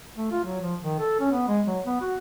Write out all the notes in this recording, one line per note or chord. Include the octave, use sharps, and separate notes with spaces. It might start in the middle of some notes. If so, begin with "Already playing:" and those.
A3
F4
F#3
F3
D#3
A4
C#4
B3
G#3
F#3
B3
F#4